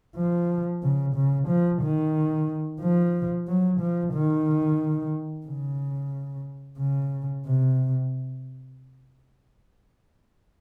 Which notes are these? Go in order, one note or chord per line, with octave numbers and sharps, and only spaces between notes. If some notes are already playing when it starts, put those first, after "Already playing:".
F3
C#3
C#3
F3
D#3
F3
F#3
F3
D#3
C#3
C#3
C3